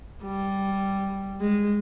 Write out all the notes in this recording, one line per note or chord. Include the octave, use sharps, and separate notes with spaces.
G3
G#3